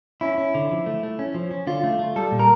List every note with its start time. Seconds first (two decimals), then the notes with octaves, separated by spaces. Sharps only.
0.21 C#4 E4
0.38 C#4
0.55 D3
0.71 F3
0.86 A3
1.03 A3
1.19 C#4
1.34 F3
1.51 C#4
1.67 D3 F4
1.83 A3
1.99 A3
2.16 G3 A4
2.32 A#2
2.39 A#4